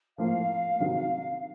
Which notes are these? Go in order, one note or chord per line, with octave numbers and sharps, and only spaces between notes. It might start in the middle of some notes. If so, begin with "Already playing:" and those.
A2 F3 A#3 F4 F5
C3 D#3 F#3